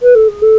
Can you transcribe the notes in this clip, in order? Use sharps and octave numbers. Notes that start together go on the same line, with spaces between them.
B4
A4
G#4
A4